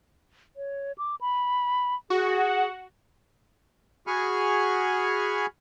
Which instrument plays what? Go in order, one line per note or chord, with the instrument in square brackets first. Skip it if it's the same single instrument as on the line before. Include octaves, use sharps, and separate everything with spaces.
[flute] C#5
D6
B5
[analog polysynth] F#4 [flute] G#4
[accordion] F#4 G#4 G#5 B5 C#6 F6